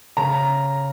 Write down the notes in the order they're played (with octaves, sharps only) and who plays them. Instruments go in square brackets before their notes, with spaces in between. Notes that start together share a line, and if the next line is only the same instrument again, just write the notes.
[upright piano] C#3 A#5